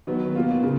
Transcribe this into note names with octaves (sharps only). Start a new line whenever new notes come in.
D#3 F#3 B3
B2 A#3 F4
C#3